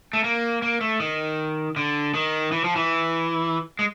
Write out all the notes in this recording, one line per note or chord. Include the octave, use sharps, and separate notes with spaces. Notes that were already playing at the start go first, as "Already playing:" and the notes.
A3
A#3
A#3
A3
D#3
D3
D#3
E3
F3
E3
G#3